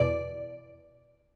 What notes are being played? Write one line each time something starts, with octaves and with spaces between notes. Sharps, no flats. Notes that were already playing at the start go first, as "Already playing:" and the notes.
Already playing: E2 B2 D5